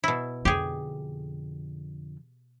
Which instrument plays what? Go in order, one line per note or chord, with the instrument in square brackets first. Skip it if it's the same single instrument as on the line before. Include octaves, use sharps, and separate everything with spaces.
[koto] B2 E4
[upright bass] F2 D3 [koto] G4 G#4